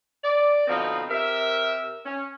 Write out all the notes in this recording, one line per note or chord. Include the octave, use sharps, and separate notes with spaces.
D5
B2 D3 F3 C4 D#4 D#5
C3 A#4 E5
C#4